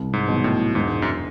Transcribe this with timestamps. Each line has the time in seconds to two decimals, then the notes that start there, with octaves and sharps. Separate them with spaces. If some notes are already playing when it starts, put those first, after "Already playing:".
Already playing: C2
0.13 G#2
0.28 B2 F#3
0.44 A2
0.75 E1 G#2
1.02 F#2